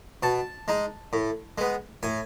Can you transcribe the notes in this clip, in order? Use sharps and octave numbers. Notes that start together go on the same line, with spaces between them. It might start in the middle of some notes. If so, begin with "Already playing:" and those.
B2 A5
G#3 D#4
A2
G#3 B3
A2 G#5